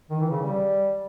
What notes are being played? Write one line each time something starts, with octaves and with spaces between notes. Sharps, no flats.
D#3
E3
C#3
G3